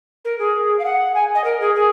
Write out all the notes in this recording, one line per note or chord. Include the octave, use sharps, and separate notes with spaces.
A#4
G#4
F5
F#5
G#5
D#5
A#4
G#4
G#4